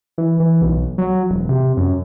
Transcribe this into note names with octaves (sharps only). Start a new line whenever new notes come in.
E3
E3
B1
F#3
E1
C3
F#2